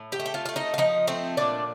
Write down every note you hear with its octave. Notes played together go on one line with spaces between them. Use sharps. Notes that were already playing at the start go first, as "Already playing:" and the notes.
Already playing: A2
G4 G5
A3
G5
F4 F5
A3 F5
D#4 D#5
F5
F3 D#4 D#5
A3 C4 C5
A#2 D4 D5